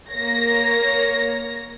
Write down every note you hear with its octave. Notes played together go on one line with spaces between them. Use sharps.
A#3 C#5 A#6